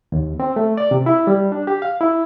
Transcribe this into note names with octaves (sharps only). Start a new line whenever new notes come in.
D#2
C4
A3
D5
C3
E4
G3
D4
G4
F5
E4